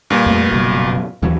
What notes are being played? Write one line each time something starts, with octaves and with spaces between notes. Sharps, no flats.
G2 A#2
F2 A3
F#1 B2 F#3
D#2 E3 F#3